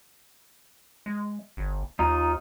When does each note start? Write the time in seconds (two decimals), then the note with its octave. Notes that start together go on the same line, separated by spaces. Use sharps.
1.06 G#3
1.57 G1
1.99 D#2 D#4 F4 A#5